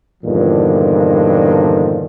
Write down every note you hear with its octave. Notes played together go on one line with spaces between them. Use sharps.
E2 G2 A#2 D3 D#3 F3